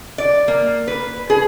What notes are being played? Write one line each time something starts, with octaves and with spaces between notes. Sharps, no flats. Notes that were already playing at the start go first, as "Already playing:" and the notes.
D5
A#3
B4
G#4